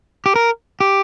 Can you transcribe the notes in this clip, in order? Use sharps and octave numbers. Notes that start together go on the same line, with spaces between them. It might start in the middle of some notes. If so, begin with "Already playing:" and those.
G4
A#4
G4